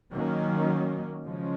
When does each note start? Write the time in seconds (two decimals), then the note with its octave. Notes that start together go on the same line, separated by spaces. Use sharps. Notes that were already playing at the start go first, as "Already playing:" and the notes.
0.13 D#3 F#3 A#3 C#4
1.26 C#3 F3 G#3 C#4